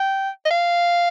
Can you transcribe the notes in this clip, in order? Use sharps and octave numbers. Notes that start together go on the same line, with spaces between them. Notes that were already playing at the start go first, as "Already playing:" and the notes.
Already playing: G5
D#5
F5